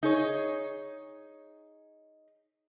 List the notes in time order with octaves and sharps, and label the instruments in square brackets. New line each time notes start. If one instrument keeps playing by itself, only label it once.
[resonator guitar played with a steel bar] D#4 G#4 C#5